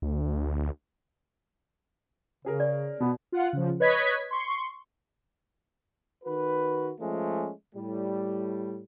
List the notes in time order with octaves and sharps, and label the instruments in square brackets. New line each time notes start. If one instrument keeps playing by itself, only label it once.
[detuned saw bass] D2
[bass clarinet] C#3 [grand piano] C#4 G#4 A#4
[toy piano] D5
[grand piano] B2 [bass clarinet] B3
[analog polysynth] F4 F#5
C#3 F3
B4 C#5 D#5 G#6 B6
C6 C#6
[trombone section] D#3 F#4 B4
F3 G#3 A3 C#4
A2 G3